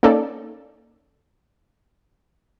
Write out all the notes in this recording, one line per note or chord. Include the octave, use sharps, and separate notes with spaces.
A#3 C#4 D#4 A4 D5